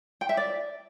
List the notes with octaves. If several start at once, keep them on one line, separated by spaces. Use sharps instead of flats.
G5
E5
D5